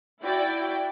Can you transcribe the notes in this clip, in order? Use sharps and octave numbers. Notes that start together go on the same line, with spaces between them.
E4 F#4 D5 G5